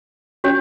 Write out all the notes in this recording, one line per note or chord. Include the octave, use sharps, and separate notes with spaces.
C#4 F#4 C#5